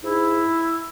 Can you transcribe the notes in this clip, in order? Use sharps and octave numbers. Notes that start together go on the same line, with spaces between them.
G#2 E4